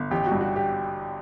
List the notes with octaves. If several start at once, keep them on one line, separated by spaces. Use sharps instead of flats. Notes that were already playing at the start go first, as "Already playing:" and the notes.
Already playing: G1
A1 G4
F#4
G2
F#4
G4